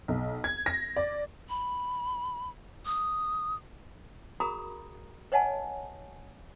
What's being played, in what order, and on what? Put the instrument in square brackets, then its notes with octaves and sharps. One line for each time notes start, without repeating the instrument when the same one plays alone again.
[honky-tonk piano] B1
G#6
A#6
D5
[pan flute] B5
D#6
[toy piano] F#4 G#4 A#4 A#5 B5 D#6
B4 C#5 D#5 F#5 G#5 A5